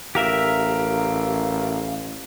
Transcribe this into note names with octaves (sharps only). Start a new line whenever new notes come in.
A1 G4 A#4 E5 F5